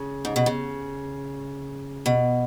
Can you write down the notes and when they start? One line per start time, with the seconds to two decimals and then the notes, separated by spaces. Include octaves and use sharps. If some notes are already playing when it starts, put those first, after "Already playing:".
Already playing: C#3
0.25 G#2
0.36 B2
0.46 C#3
2.06 B2